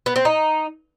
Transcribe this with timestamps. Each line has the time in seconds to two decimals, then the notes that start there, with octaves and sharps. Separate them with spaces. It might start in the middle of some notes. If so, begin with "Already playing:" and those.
0.06 B3
0.16 C4
0.25 D#4